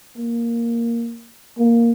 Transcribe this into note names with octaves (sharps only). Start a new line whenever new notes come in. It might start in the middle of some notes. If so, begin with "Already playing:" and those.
A#3
A#3